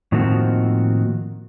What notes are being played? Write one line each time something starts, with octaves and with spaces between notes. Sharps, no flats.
A2 D#3 F3 A#3 C4 F#4